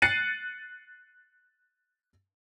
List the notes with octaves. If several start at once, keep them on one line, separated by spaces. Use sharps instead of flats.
F#6 A6 C7 C#7 D#7